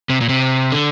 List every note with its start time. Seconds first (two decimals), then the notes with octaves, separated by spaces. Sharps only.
0.10 C3
0.21 A#2
0.29 C3
0.72 D3